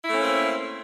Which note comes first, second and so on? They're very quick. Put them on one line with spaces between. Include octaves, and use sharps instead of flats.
E4 A3 C#4 A#3 C4